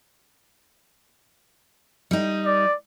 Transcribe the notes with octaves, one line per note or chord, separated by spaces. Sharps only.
G3 D#4
D5